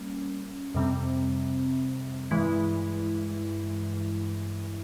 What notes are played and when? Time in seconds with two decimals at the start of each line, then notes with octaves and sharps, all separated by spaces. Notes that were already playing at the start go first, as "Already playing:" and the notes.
Already playing: G3 A#3 C#4
0.74 F2 C3 G3 C4
2.31 G2 E3 G#3 E4